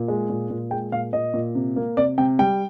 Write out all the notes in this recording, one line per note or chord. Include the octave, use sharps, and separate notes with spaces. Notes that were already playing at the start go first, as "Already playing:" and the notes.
Already playing: A#2
G#3
A#2
A#2
G#3 G5
A#2 F5
A#2 D#5
A#2
C3
A#3
C3 D5
C3 G5
G3 G5